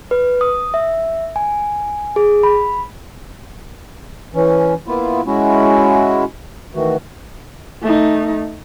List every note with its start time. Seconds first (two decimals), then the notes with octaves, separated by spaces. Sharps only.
0.11 B4
0.41 D#6
0.74 E5
1.36 G#5
2.16 G#4
2.43 B5
4.35 E3 C#4
4.87 A#3 B3 E4 F4
5.26 G#3 C#4 E4 F#4
6.75 D#3 E3 A3 F#4
7.83 A3 D#4